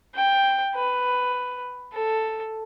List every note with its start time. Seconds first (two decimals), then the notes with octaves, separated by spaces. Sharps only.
0.15 G5
0.75 B4
1.93 A4